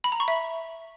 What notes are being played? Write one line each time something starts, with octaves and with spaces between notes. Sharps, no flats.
B5
A#5
C#6
E5